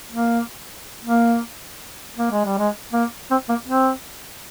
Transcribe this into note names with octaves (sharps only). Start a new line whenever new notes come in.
A#3
A#3
A#3
G#3
G3
G#3
A#3
C4
A#3
C4